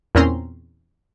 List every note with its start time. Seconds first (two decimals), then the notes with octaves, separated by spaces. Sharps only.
0.15 E2 A#2 C4 C#4 A#5 C6